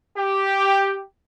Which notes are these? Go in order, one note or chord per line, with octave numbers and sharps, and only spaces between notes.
G4